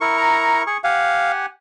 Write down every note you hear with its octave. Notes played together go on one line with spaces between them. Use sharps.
E4 A#4 C#6
A#5
G#4 C#6
G4 F5 F#5 G#5